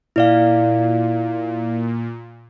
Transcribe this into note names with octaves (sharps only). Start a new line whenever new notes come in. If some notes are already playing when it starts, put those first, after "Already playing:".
A#2 E4 D5 F5